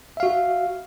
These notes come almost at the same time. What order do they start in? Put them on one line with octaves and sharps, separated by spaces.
E5 F5 F#4